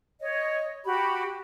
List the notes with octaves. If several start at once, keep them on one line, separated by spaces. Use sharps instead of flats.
C#5 D#5
F#4 G4 B5